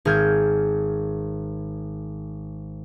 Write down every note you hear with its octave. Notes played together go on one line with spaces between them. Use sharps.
G#1 G#4 F6 G6 G#6